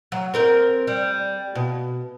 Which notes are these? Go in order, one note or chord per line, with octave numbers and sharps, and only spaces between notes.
F#3
C4 A#4 C5
G3
B2